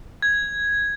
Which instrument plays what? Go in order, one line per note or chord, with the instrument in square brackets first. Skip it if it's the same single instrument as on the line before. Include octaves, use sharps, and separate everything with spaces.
[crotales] G#6